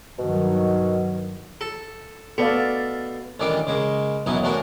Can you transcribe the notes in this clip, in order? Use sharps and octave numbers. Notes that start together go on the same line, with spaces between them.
G2 B2 D#3 F#3
A4
B2 A4 D5 F5
A1 D#3 E3 G3 D4 D6
C#3 G#3 A#3
B1 F#2 B2 E3 D#4 E4
A2 E3 D4 F#4 A#4